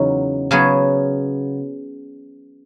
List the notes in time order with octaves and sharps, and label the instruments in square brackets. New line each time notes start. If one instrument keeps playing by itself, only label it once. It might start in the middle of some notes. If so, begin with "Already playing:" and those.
Already playing: [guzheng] E2 C#3 F#3 D#4
C#3 F#3 B3 G#4